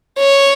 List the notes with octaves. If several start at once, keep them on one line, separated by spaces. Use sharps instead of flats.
C#5